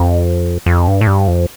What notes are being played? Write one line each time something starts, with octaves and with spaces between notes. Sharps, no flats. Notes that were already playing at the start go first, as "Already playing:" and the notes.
Already playing: F2
F2
G2
A2
G2
F2